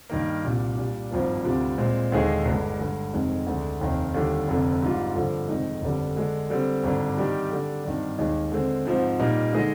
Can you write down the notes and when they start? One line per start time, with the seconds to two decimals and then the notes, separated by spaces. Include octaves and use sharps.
0.10 G2 D#3 A#3
0.44 C2 A#2 G3 D4
0.77 A#2 G3 D4 G4
1.11 G#1 G2 F3 A#3
1.44 D2 C3 G3 D4 F4
1.78 A#2 G#3 C4
2.12 D#2 D3 G#3 D#4 G#4
2.45 G1 G2 D3 G#3
2.79 G2 D3 G#3
3.13 F1 F2 D#3 G#3
3.46 D2 D3 G#3 D4
3.80 F1 D#2 D#3
4.14 D#2 D3 G3
4.48 F1 F2 D3
4.82 G#2 G3 D4 F4
5.15 G2 D3 F3
5.49 F1 F2 D#3 G#3 D#4
5.82 G1 F2 D3 G3 D4
6.16 D3 G#3 D4
6.50 D3 G3 C4
6.83 G#1 G2 D3
7.17 D#3 G3 D4 G4
7.50 D3 G3 D4
7.84 G#1 G2 D#3 G3 D4
8.18 D#2 D#3 G#3 D#4 G#4
8.52 D3 G#3 C4
8.85 G#2 F3 C4
9.19 A#2 G3 A#3 D#4
9.53 D3 G#3 D#4 G#4 D#5